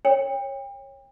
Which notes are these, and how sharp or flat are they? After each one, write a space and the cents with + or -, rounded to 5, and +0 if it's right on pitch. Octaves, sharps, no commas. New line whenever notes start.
A#4 +0 C#5 -20 G5 +30